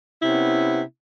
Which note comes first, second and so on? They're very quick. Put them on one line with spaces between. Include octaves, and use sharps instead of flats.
E4 C3 C#4 B3